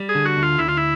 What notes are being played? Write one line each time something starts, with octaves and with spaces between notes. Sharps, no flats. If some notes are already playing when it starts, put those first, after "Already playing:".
Already playing: G3
G#4
D3
F#4
D2
F4
D2 E4
F4
E4